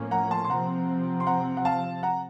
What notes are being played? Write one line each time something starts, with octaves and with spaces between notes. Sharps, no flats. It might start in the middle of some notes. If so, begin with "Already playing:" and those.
Already playing: A2 F3 A#3 C#4
F#5 A#5
A5 C6
C6
C3 F3 C4 F#5 A#5
C6
F#5 A#5
F#5
F5 A5
F#5 A#5